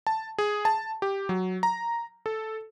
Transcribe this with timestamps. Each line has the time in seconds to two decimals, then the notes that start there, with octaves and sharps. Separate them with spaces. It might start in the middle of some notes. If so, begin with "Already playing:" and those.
0.07 A5
0.38 G#4
0.65 A5
1.02 G4
1.29 F#3
1.63 A#5
2.26 A4